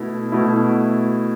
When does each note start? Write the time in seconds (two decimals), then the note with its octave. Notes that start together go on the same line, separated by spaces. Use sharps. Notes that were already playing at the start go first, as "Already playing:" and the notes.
Already playing: B2 A3 E4
0.32 B2 A3 E4